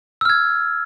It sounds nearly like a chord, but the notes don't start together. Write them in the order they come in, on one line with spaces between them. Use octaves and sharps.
E6 F6 G#6